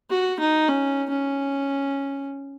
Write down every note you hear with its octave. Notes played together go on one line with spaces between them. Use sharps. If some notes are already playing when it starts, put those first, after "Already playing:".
F#4
D#4
C#4
C#4